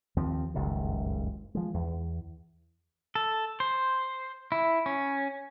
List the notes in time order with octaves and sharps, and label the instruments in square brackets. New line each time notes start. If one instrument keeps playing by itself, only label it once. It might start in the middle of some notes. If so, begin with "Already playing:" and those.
[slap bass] D#2 F3 C4
F#1 C#2 G2 D#3
F3 G#3
E2
[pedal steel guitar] A4
C5
E4
C#4